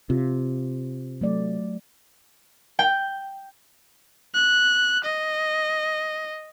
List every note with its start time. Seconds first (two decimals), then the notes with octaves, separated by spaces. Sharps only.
0.10 C3 F4
1.21 F#3 A3 D5
2.79 G5
4.34 F#6
5.05 D#5